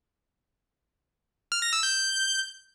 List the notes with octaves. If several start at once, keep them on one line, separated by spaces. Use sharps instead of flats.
F6
A#6
E6
G6